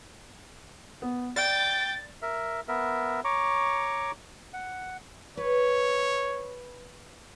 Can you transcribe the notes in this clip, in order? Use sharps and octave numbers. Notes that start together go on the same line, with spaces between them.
B3
D5 G5 A6
A#4 E5
B3 A#4 E5
C#5 A#5 C#6 D6
F#5
B4 C#5